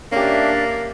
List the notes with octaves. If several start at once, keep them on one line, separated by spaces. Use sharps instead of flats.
A#3 C#4 D4 G4 E5